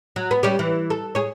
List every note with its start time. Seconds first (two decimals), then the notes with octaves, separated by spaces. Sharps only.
0.16 F#3
0.31 B3
0.43 G3 C#4 G4
0.59 E3
0.90 A4
1.15 G#4 C#5